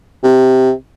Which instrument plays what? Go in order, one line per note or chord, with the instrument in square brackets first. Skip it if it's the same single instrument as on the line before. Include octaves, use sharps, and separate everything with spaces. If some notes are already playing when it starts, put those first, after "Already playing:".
[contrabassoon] C3